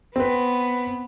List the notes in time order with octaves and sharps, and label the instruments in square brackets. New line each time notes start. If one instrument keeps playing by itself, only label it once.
[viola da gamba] B3 [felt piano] C4 B4